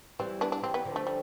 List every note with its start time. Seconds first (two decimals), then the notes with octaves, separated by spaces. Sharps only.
0.19 E3 G3 C4
0.41 B3 D4
0.52 D4
0.62 E3 G3 C4
0.74 B3
0.85 D3 F3
0.96 A3
1.07 G3